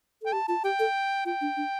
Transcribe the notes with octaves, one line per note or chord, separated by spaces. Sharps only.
A4 G5
G4 A5
F4 A5
G4 G5
A4
F4 G5
D4
D4